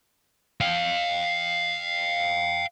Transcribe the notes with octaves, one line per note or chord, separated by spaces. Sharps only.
F5 G5